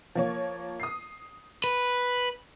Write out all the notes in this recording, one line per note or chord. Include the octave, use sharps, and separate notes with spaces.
F3 A#3 C#5
D#6 C7
B4